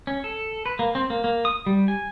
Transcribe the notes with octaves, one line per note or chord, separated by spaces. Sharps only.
C#4
A4
B4
A#3
C4
A#3
A#3
D#6
G3
G#5